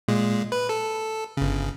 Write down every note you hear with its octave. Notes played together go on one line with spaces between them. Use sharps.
A#2 G#3
B4
A4
G1 C#3